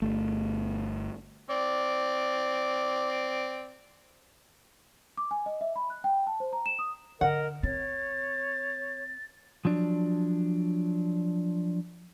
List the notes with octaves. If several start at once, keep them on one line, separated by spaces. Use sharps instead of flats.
G1 A3
C4 D5
D6
G#5
D#5
E5
B5
F#6
G5
A5
C5
A#5
E7
D#6
D3 A#4 D#5 F#5
C4 C#5 A6
F3 F#3 D4